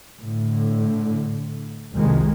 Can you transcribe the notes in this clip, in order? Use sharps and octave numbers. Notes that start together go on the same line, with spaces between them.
A2 D3
C2 F2 A#2 D#3 G#3